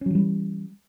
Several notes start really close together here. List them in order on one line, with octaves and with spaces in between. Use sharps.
C#4 F#3 E3 G3